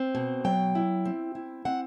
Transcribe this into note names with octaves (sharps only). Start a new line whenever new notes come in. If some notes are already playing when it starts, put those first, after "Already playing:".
Already playing: C4
B2
F#3 G5
E4
C4
E4
C4 F#5